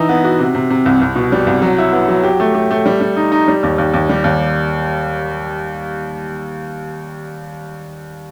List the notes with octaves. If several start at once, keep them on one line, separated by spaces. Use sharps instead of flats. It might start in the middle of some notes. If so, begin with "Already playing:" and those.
Already playing: E3 D#4 E4
B3
F#4
C3
C3
C3
C2
C2
B2
G3
C2
F#3
E4
B3
F#3
G4
A3
A3
A3
G3
G3
D#4
D#4
G3
D#2
D#2
D#2
G3
D#2